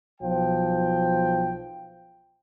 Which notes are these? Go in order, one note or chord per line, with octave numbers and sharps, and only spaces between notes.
B1 F3 G5